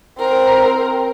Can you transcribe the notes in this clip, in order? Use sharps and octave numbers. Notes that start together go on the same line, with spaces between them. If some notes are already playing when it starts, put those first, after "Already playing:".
C4 A#4